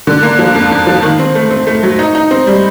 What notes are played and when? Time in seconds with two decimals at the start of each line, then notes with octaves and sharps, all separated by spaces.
0.07 D3
0.23 A#3
0.39 F3
0.55 F2
0.71 F2
0.87 F3
1.02 D#3
1.19 C4
1.35 A3
1.51 C4
1.67 A3
1.83 F#3
1.99 D#4
2.15 D#4
2.31 C4
2.47 G3